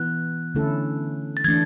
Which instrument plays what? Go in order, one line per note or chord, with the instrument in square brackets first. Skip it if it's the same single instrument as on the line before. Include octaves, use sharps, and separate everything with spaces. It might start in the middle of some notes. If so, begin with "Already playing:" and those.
Already playing: [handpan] E3 B3 E4 [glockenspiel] F#6
[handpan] D3 A3 C#4 E4 A4
[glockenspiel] A6
[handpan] E3 A3 D4 [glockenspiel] G#6